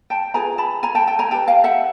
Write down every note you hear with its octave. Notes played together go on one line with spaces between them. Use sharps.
G5 A5
F4 G#4 B4 G#5 A#5
A5 B5
G#5 A#5
G5 A5
G5 A5
G#5 A#5
E4 G4 B4 G5 A5
F5 G5
E5 F#5